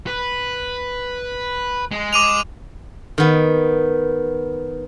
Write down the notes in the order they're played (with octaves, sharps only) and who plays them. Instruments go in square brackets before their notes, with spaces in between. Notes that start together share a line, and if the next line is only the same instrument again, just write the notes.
[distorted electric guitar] B4
G#3
[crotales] D6 D#7 F7
[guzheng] D#3 B3